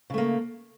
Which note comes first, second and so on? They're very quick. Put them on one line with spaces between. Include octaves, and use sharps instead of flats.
C#3 A3 A#3